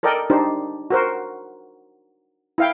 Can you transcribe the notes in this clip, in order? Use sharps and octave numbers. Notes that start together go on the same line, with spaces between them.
A4 A#4 D5 D#5 G5
D4 D#4 G4 C5
F#4 A#4 C5
E4 F5 G5